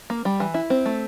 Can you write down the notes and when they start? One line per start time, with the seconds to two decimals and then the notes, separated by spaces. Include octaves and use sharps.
0.10 A#3
0.25 G3
0.40 E3
0.54 E4
0.70 C4
0.86 A3